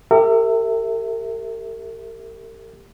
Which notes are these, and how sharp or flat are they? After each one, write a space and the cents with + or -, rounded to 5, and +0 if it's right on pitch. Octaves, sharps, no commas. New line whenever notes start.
G4 +10 A#4 -40 E5 +0